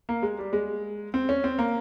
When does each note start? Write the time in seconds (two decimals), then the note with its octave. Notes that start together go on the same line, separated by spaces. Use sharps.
0.09 A#3
0.23 G#3
0.39 G3
0.53 G#3
1.14 C4
1.29 C#4
1.44 C4
1.59 A#3